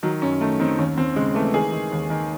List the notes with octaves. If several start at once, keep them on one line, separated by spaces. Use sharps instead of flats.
D#3 F#3
F#2 C#4
D#3 A3
D#3 C4
D#2 C#4
D#2 C4
C#3 G#3
E3 A3
D#3 G#4
D#3
D#2
D#3